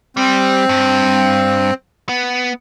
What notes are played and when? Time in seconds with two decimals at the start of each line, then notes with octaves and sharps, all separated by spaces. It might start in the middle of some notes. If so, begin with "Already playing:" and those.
0.17 G3 C4
0.69 G2
2.09 B3